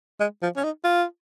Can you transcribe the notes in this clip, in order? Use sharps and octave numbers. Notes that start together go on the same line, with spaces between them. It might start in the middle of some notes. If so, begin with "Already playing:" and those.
G#3
F3
C#4
D#4
F4